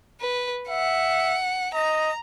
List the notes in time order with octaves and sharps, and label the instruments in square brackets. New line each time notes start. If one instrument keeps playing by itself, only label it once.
[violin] B4
[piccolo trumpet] E5 [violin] F#5
[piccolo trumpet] D#5 [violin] A#5